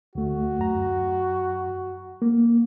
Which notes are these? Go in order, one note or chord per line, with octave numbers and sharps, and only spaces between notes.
D2 A3 F#4
F#2 A#5
A#3